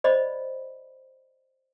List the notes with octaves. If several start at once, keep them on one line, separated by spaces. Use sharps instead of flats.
C5 D5 D#5 B5